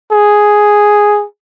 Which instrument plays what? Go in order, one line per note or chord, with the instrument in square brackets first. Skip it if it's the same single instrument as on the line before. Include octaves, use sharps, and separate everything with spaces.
[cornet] G#4